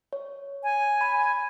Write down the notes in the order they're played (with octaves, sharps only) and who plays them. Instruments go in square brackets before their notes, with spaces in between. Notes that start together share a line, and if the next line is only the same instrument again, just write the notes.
[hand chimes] C#5
[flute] G#5
[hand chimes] B5